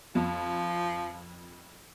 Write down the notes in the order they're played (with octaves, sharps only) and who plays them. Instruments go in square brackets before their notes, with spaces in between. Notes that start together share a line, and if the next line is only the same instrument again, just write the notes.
[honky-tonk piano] F2 [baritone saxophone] F3